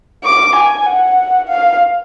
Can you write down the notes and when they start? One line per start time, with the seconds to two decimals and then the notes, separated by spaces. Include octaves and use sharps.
0.25 D6
0.56 G#5
0.86 F#5
1.48 F5